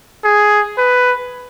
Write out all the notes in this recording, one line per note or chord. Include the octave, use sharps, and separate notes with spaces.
G#4
B4